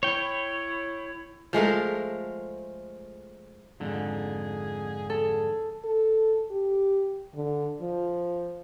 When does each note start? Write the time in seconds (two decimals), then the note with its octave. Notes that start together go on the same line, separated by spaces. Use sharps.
0.03 E4 C#5 G5
1.53 F3 G#3 A3 A#4
3.80 F2 G#2 D3 G#4
5.10 G#4 A4
5.85 A4
6.51 G4
7.35 D3
7.82 F3